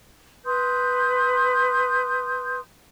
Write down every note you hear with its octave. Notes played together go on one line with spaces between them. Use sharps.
B4 C6 D#6 G6